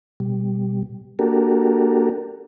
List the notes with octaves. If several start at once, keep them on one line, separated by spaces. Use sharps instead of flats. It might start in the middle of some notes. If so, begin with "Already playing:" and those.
B2 G3
A#3 D4 F#4 G4 A4 A#4